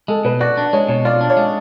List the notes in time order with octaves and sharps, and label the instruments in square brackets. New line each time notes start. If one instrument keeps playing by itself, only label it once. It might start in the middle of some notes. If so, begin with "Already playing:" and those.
[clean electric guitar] G#3 [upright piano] A4
[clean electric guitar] B2 [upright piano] B4
[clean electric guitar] F#4 [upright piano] D5
[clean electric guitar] D4
[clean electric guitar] G#3 [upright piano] C#5
[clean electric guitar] B2 [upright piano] C#5
[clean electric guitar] F4 [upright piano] D5
[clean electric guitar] D4
[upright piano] C#5
[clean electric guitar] G#3